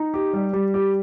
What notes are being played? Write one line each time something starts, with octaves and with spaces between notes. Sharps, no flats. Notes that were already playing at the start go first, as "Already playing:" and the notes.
Already playing: D#4
G4
G3
G3
G4